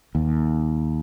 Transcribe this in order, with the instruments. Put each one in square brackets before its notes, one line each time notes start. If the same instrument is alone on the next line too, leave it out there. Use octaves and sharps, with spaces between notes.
[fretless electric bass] D#2